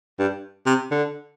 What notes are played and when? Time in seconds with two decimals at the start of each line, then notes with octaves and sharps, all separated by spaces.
0.19 G2
0.66 C3
0.91 D3